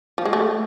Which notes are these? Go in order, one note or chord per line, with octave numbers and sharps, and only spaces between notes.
F3
G#3
A3